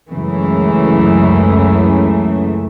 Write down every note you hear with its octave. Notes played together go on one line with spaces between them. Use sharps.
C#2 F#2 C#3 E3 A3